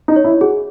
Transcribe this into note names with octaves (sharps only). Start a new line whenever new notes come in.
D#4
C#5
E4
F#4 G#4